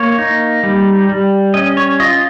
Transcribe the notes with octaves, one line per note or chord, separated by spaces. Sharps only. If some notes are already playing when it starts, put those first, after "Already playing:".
Already playing: A#3 C#5
D#4
G3
G3
C#4 D#5
C#5
F4 D#5